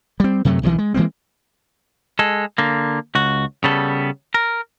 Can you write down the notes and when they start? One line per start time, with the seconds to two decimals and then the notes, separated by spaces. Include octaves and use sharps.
0.20 G3 C4
0.45 F#2 C3 F#3 A3
0.63 B1 C3 D#3 E3
0.78 G#3
0.94 E3 G#3 A#3 C4
2.19 G#3 A4
2.58 D3 A#3
3.15 C#2 F#4
3.64 C#3 G3 B3 A4
4.34 A#4